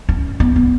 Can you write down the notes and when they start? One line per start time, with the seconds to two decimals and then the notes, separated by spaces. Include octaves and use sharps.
0.09 C#4
0.40 B3
0.56 B3